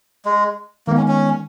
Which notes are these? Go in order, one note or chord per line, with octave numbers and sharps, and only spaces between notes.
G#3
D#3 G#3 A#3 B3
C#4
C#4